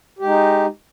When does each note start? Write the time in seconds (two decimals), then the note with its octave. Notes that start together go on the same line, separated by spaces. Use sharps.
0.19 G4
0.22 G#3
0.26 D#4